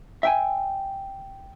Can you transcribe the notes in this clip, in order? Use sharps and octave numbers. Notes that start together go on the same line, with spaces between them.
E5 G5 G#5